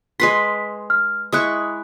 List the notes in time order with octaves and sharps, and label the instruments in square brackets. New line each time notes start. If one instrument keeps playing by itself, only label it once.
[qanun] G#3 B4 C6 [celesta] B6
[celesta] F6
[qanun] G#3 E4 C#6 [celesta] D#6 F#6